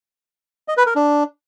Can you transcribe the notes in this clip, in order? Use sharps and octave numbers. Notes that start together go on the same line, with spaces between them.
D#5
B4
A#4
D4